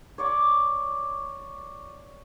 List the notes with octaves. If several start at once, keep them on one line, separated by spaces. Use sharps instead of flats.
C#5 D5 C#6